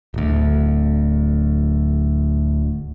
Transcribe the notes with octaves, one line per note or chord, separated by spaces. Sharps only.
D1 D2